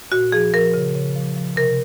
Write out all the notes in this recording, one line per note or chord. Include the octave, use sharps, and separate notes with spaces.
A#2 F#4
F3 G#4
F3 A#4
C#3
C#3
F3
F3
C3 A#4